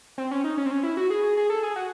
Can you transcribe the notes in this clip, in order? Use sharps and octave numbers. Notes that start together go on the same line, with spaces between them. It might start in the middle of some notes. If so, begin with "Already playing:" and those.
C4
C#4
D#4
C#4
C4
C#4
E4
F#4
G#4
G#4
G#4
A4
G#4
F#4